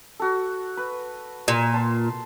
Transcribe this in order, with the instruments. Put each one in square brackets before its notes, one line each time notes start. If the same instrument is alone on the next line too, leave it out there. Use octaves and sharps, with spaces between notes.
[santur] F#4 A4
B4
[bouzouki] A#2
[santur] A5 C6